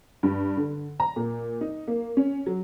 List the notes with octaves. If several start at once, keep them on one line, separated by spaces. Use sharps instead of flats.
G2
D3
A#5
A#2
D#4
A#3
C#4
F#3